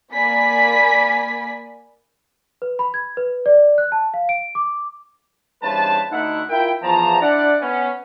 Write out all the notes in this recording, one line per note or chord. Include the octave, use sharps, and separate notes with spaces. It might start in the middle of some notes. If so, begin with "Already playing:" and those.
A#3 D5 G#5 B5 B6
B4
B5
G#6
B4
D5
F#6
A5
F5
D7
D6
E2 G2 C#4 B4 C5 A5
D2 A3 D#4 E4 E5 F#5
E4 F4 A#4 E5 G5
E2 F3 A5 A#5
D4 E4 D5 F#5
B3 C#4